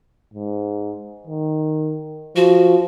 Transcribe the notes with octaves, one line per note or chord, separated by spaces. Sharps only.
G#2
D#3
F3 F#4